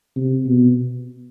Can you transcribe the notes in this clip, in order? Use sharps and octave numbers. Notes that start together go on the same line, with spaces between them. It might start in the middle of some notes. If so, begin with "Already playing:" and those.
C3
B2